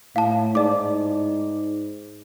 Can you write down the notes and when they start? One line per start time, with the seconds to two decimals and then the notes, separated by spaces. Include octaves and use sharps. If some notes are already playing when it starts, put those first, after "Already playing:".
0.16 A2 F5 A5
0.55 G#2 D5 D6